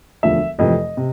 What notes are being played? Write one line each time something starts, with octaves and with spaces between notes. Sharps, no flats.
E1 D2 D3 F3 E5
F1 F2 C3 E3 D#5
C3